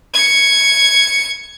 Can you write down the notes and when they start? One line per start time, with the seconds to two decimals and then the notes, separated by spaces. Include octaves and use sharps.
0.14 G#6 C#7